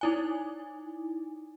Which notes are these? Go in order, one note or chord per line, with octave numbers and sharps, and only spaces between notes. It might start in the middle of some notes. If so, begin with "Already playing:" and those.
D#4 E4 G#5